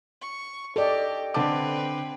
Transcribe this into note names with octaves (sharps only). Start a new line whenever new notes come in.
C#6
G4 A4 D5 D#5
D3 C4 B4 A5 D6